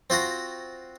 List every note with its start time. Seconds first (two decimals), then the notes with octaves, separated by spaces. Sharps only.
0.10 C4 F4 F#4 A#5